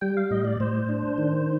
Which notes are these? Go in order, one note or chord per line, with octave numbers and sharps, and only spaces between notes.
G3 G5
F5
A2 D#5
D5
A2 C5
D4
D#3